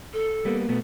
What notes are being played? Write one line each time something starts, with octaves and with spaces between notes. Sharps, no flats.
A4
G3 A#3 B3
B2 A3 B3